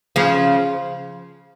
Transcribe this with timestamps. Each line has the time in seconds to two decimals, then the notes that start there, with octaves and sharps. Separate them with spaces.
0.16 C#3 F3